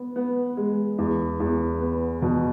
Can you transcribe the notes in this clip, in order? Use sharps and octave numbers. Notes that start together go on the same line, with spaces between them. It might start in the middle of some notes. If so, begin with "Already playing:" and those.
Already playing: B3
B3
G#3
E2
E2
B3
B2